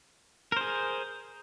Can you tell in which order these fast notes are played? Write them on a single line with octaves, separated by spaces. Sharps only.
A#4 C5 G#4